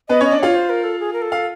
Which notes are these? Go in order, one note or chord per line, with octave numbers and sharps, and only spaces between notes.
B3 B4 D#5
C#4 C#5 D#5
D4 D5
F4 C#5 F5
C5
A#4
A4
G#4
A#4
A4
F5